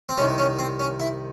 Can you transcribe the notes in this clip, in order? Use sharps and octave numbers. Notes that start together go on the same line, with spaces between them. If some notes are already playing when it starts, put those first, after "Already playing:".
C4
C2 C3 D#3 C#4
C#4
C4
C#4
E4